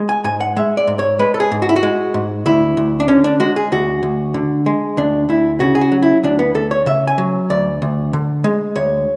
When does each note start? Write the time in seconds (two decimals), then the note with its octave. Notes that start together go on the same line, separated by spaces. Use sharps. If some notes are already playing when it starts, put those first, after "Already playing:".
Already playing: G#3
0.09 G#5
0.24 G#2 G#5
0.41 F#5
0.56 G#3 E5
0.77 D5
0.87 G#2
0.99 C#5
1.19 G#3 B4
1.34 A4
1.40 G#4
1.51 G#2
1.62 F#4
1.69 E4
1.76 F#4
1.83 G#3
2.14 G#2
2.46 D2 E4
2.77 D2
3.00 D4
3.08 D3 C#4
3.24 D4
3.40 G#3 F#4
3.56 G#4
3.72 D2 F#4
4.03 D2
4.34 D3
4.66 G#3
4.97 D2 D4
5.29 D2 E4
5.60 C#3 F#4
5.75 G#4
5.81 F#4
5.92 F#3
6.02 E4
6.23 D2 D4
6.39 B3
6.55 D2 A4
6.71 C#5
6.86 C#3 E5
7.07 G#5
7.18 F#3
7.50 D2 D5
7.82 D2
8.13 D3
8.44 G#3
8.75 D2 C#5